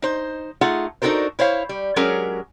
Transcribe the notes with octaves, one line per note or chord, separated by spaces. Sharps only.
D#4 C5
A3 D#4 F4 G#4 F#5
D4 D#4 F#4 A4 A#4 C5
E4 C5 C#5 F5
G3
F#3 G#3 C#4 G4 G#4 A#4